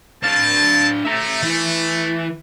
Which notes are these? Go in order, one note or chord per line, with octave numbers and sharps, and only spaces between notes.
C4 D4 F5 A5
A3 E5 A#5
E3